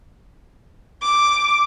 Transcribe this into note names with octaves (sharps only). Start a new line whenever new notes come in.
D6